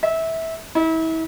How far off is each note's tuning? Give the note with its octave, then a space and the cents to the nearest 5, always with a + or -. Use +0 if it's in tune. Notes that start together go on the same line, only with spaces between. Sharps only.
E5 -20
E4 -35